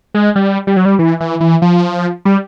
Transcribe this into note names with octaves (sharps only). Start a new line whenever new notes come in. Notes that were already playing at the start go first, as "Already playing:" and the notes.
G#3
G3
G3
F#3
G3
E3
E3
E3
F3
G3